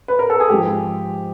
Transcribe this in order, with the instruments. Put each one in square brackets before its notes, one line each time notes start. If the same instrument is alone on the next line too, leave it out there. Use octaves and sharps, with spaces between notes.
[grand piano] B4
A#4
A4
G#4
G#2 F3 G4